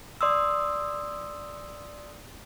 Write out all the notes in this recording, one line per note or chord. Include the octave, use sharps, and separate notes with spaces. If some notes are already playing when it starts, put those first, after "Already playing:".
D5 C6 D#6 E6